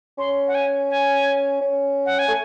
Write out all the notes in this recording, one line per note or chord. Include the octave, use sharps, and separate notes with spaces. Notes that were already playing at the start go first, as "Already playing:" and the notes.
C#4 C6
F#5
G#5
G#5
C#4
F#5
G#5
A3